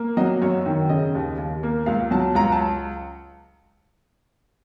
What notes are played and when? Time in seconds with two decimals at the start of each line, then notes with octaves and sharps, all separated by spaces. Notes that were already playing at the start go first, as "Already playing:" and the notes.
Already playing: A#3
0.17 F#3 D#5
0.42 F#2 C#5
0.66 D#3
0.89 C#3 D#5
1.15 D#2
1.38 D#2
1.63 A#3
1.86 C#2 F5
2.11 F#3 A5
2.35 C#2 A#5
2.52 A5